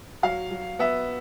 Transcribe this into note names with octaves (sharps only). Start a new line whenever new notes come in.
F#3 F5
F#3
B3 E5